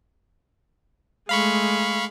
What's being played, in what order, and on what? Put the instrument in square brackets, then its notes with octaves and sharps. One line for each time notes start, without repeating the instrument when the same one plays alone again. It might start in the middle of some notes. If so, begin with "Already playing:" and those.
[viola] G#3 A3 [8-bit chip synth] F5 B5 C#6